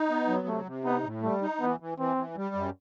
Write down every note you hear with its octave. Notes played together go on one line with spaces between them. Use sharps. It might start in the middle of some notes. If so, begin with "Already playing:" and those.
Already playing: D#4
B3
F#3
C3 A3
C3
B3 D#4
A2
G3 A3
D#4
E3 B3
E3
E3 C4
E3
G3
F#2